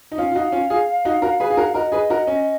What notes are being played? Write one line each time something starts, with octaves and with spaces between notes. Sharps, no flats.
D#4
C#4 F4 F5
F4
D#4 F#4
C#4 F4
F4 G#4
D#4 F#4
F#4 A#4
G#4 B4
G#4
F#4 A#4
F#4 A#4 D#5
G#4 B4
F#4 A#4
C#4